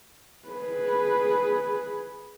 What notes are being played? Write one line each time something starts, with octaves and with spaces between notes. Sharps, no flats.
G#4 B4